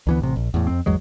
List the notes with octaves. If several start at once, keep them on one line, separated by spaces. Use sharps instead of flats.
D2 E3 B3
A1 C3
A#1
E2 A2
F2 C4
G#1 E2 F#3 G#3